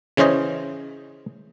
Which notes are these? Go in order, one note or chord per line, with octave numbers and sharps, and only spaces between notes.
C#3 E3 C#4 C5 D#5